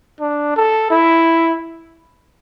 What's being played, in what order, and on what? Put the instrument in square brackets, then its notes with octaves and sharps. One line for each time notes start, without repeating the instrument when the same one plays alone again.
[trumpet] D4
A4
E4